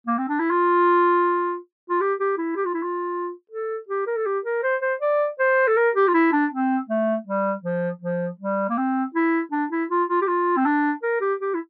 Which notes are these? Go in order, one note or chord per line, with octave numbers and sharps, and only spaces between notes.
A#3
C4
D4
E4
F4
F4
G4
G4
E4
G4
F4
E4
F4
A4
G4
A#4
A4
G4
A#4
C5
C5
D5
C5
A4
A#4
G4
F4
E4
D4
C4
A3
G3
F3
F3
G3
A#3
C4
E4
D4
E4
F4
F4
G4
F4
C4
D4
A#4
G4
G4
E4